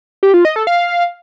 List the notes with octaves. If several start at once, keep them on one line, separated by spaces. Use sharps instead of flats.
G4
F4
D#5
A4
F5